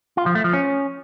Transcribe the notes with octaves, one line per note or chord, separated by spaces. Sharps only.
F4
F3
A3
F3
C#4